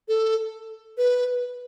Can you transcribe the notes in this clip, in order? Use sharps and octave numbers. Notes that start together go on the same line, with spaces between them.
A4
B4